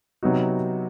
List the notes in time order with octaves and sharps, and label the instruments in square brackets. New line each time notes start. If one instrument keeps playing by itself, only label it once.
[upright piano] C3 F#3 B3 D#4 F#4